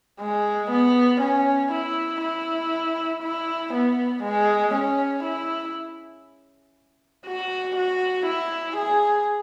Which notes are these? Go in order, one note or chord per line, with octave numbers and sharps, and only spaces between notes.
G#3
B3
C#4
E4
E4
E4
B3
G#3
C#4
E4
F#4
F#4
E4
G#4